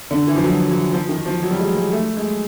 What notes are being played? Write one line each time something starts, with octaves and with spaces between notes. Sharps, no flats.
D3
E3
F3
F#3
F#3
F3
D#3
F3
F#3
G3
G#3
G#3
A3
G#3